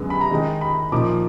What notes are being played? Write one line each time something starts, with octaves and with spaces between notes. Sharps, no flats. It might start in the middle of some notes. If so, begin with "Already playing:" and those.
Already playing: F#2 D3 G#3 B3
B5
A#5
D#3 G#3 D#4
B5
A#2 F3 A#3 D#4 D6